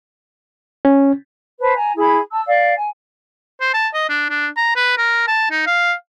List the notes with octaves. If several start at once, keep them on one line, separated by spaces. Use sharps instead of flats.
C#4
B4 C5 A5
G#5 A#5
E4 G#4 B5
A5 E6
D5 F5
G#5
C5
A5
D#5
D4
D4
A#5
B4
A#4
A5
D#4
F5